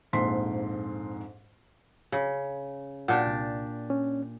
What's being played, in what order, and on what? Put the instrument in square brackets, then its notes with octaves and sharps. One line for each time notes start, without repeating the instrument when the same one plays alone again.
[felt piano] A#1 F2 G#2 C6 B6
[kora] C#3
[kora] A#2 D4 G4 [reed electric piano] F#5
[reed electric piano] C2
C#4